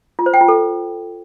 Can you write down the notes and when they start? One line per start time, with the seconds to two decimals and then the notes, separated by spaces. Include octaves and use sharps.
0.19 F4
0.26 C5
0.34 G5
0.41 F4
0.48 A4